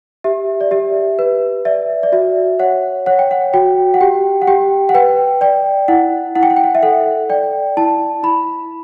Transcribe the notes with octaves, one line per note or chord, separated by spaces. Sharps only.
G4 E5
D5
G4 E5
B4
D5 E5
D5
F#4 E5
C#5 F#5
C#5 F#5
G5
F#5
F#4 G5
F#5
G4 G5
F#5
G4 G5
F#5
B4 G5
D5 G5
E4 F#5
E4 F#5
G5
F#5
G5
F#5
E5
A4 F#5
D5 G5
E4 A5
E4 B5